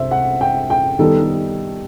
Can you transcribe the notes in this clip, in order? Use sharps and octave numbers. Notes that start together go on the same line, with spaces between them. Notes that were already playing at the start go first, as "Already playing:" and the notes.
Already playing: C2 C3 C5 E5
F#5
G5
G5
D#3 G3 B3 D#4 A4